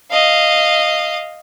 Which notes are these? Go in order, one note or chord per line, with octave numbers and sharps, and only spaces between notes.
D#5 F5